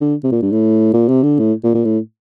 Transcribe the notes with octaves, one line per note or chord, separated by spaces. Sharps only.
D3
C3
A#2
G2
A2
A#2
C3
D3
A2
A#2
A#2
A2